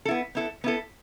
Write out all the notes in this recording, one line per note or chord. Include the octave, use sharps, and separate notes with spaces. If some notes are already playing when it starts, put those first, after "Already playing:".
A4
B3 E4
B3 E4 A4
B3 E4 A4